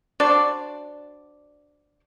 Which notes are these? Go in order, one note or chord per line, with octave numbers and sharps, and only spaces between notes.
D4 F#4 C5 D5